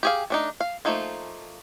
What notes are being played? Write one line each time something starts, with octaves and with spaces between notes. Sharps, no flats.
G4 G#4 F5
A3 D4 D#4
F5
F3 A3 A#3 D#4 F4